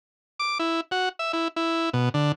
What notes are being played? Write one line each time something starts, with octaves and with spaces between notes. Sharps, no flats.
D6
E4
F#4
E5
E4
E4
B2
D3